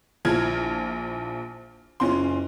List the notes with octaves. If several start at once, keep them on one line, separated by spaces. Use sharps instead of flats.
A#1 F3 E4 F6 G#6
F#1 C#4 F4 C6